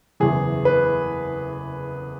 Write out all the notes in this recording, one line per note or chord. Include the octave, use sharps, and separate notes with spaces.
F#1 E2 E3 G#4
B4